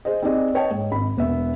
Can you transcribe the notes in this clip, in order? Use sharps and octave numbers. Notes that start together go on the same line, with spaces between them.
G#4 C5 D#5
C4 D#4 G4 G#4 D5 D#5
B4 C#5 D#5 G5 A5
G#2
G#1 B5
E1 B3 E5